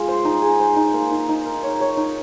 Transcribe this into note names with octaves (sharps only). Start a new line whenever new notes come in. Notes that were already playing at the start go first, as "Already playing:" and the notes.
Already playing: G#3 F4
C5
D#4
G#4
C5
D#4
A#3
D#4
D#4
A#4
C#5
C#5
D#4